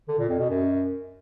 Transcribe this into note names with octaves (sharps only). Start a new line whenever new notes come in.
D3
A#2
F2
B2
F#2